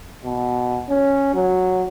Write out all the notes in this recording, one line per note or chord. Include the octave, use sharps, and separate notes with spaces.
B2
C#4
F#3